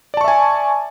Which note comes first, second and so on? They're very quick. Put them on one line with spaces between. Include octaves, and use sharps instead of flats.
D5 A5 C#6 E5 G#5